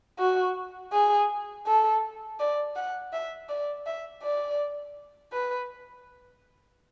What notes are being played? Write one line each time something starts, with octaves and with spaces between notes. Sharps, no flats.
F#4
G#4
A4
D5
F#5
E5
D5
E5
D5
B4